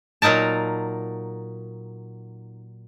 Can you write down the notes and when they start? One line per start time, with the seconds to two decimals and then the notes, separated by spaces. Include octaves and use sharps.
0.22 A#2 F#3 D#4 A#4 A5